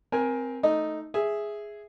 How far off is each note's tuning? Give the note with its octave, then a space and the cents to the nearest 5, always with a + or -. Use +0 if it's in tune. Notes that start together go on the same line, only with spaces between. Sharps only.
C4 -5 A#4 +20 G#5 +0
A3 +0 D#4 +0 D#5 +0
G#4 +0 E5 +0